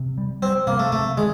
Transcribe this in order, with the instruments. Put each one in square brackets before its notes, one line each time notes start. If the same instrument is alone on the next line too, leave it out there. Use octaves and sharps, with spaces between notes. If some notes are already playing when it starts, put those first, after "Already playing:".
Already playing: [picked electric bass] C3
G3
[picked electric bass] G3 [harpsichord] C4
[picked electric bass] C3 [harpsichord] A#3
[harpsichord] A3
[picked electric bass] C3 [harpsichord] A3
[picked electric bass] D#3 [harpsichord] G#3